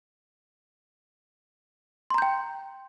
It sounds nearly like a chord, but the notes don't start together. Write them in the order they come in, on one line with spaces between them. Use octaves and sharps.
C6 A#5 G6 G5